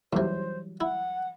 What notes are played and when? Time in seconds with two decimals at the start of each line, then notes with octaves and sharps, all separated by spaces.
0.13 D#2 C3 E3 F#3 G3 C5
0.81 E4 F#5